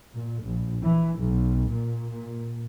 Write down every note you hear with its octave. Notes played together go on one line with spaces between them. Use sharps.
A#2
A#1
E3
B1
A#2